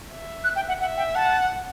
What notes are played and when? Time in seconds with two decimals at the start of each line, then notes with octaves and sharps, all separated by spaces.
0.09 E5
0.44 F#6
0.56 G5
0.68 F#5
0.80 E5 F#5
0.97 G5
1.15 F#5 A5